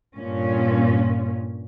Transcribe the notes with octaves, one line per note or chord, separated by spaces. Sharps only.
G2 A#2 C#4